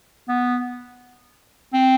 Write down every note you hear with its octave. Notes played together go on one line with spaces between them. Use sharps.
B3
C4